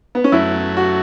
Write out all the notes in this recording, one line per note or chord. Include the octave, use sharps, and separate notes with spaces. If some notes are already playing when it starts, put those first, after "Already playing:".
B3
C#4
F#2 F#3 A3 E4
F#4